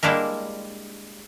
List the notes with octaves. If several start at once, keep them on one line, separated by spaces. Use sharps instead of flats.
G3 G#3 A#3 D4 E4 A#4